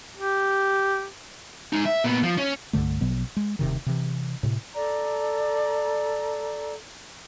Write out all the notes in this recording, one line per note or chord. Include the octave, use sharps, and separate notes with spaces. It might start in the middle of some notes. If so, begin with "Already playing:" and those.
G4
G#3 D#4
E5
A#2 B3
F3
C#4
C2 G2 D3 A3
A#1 B2 F#3 B3
G#3
D#1 C3 D#3
C3 E3
A2 C3
A4 D5 A#5